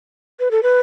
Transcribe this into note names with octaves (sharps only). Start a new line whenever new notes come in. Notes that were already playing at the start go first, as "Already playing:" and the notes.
B4
A4
B4